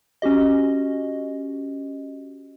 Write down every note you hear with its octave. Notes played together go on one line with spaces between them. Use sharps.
C#4 F#4 G4 D#5